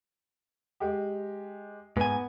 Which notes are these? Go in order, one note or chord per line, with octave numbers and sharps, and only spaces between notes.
G#3 G4
G#2 B3 G#5